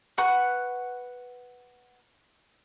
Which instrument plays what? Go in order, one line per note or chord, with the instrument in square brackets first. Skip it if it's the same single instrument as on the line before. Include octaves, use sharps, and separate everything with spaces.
[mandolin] B4 F#5 C#6 F#6